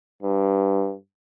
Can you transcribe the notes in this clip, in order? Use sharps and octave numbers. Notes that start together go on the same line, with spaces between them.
G2